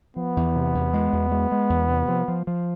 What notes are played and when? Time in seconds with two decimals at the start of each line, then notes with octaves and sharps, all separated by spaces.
0.16 F3 B3
0.37 E2
0.56 C3
0.75 E2
0.93 G#3
1.12 E2
1.32 G#3
1.52 G#3
1.70 E2
1.89 C3
2.08 F3
2.28 F3
2.47 F3